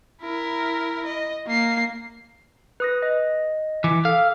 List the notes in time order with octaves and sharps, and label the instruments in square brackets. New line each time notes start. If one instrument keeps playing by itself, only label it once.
[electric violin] E4 A#4
D#5
A#3 C7
[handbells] B4 D#6 A#6
D#5
[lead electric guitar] E3 [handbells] D6 B6
[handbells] A4 [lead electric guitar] F5